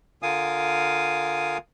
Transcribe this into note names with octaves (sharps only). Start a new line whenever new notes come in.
D3 F4 A#4 F5 G#5 D#6